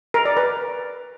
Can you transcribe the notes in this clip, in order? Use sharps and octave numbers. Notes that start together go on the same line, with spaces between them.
A#4
D5
B4